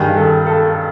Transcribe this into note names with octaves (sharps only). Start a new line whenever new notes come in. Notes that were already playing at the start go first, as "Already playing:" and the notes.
Already playing: G2 D#3 G#4
A4
A4